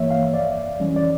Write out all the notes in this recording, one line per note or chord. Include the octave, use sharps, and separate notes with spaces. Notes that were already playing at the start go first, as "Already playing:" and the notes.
Already playing: G2 E3 A#3 C#5 E5
F5
F2 D5
E3 G3 C#4
D5